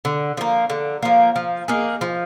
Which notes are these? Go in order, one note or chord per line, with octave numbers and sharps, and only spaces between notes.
D3
F3 A#3
D3
F3 A#3
F3
A#3 D#4 G#4
F3